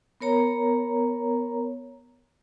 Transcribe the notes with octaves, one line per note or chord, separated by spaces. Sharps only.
B3 A#4 C#5 A#5